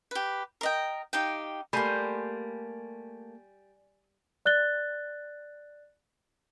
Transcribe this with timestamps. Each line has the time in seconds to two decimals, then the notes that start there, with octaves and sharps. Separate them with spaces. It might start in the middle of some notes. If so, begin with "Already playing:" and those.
0.11 G4 B4
0.61 A#4 D#5 G5
1.13 D#4 G4 F5 G5
1.73 G3 A3 A#3 G#5 B5 C6 G6
4.45 D5 F#6 A6 G7